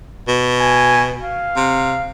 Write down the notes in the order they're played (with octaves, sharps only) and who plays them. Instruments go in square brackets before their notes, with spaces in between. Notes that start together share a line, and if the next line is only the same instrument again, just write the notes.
[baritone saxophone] B2
[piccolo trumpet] G#5
F5
[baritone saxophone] C3